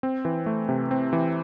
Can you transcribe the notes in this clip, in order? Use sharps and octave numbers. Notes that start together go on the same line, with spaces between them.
C4
E3
A3
C3
C4
E3